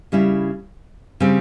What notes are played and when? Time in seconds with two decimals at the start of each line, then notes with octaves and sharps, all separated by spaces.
0.12 C#3 G3 C#4 E4
1.20 C#3 G3 C4